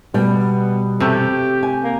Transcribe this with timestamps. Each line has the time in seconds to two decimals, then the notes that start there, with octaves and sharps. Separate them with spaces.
0.14 B2 G3 B3
1.00 C3 A3 G4
1.63 G#5
1.84 A#3